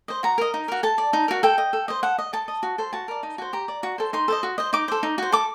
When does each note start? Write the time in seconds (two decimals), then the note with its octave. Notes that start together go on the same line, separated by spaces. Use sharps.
0.08 C5 D#5
0.23 F#4 A#5
0.38 A#4 D#5
0.54 D#4
0.68 F#4 A#4
0.83 A4 A5
0.98 D5
1.13 D#4
1.28 F#4 A#4
1.43 A4 G5
1.58 D#5
1.73 A4
1.88 C5 D#5
2.03 A4 F#5
2.18 D#5
2.33 A4 A5
2.48 D#5
2.63 F#4
2.78 A4 C5
2.93 F#4 A5
3.08 A#4 D5
3.23 D#4
3.38 F#4 C5
3.53 G4 A#5
3.68 D5
3.83 F#4
3.98 A4 C5
4.13 D#4 C6
4.28 A4 C5 D#5
4.43 F#4
4.58 C5 D#5
4.73 D#4 D6
4.88 A4 C5
5.03 D#4
5.18 F#4 C5
5.32 A4 D6